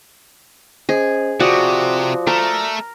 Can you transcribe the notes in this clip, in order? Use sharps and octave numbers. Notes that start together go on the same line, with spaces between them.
C#4 G#4 C5 D#5
C3 F3 F#4 D5 D6 D#6
A3 A4 A#4